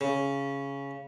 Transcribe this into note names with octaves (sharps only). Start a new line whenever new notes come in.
C#3